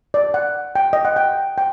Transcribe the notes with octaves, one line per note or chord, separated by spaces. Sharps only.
D5
F#5
G5
D#5
F#5
G5
G5